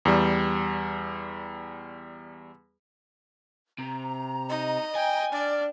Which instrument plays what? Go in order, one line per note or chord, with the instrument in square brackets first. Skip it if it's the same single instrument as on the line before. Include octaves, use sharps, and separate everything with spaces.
[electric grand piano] E2 G3
[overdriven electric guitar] C3 [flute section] A#5
[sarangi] D#4 [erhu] D#5
[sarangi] G5 [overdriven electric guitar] G#5
[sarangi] D4 [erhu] D5 [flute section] F6